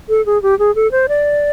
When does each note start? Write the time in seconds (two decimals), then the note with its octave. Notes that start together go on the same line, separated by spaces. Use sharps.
0.09 A4
0.26 G#4
0.42 G4
0.59 G#4
0.75 A4
0.92 C5
1.09 D5